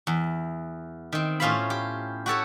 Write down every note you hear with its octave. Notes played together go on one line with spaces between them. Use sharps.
E2
D#3 C4
A2 C#4 F4 C5 F5 B5
G4
F#4 G4 A4 C#5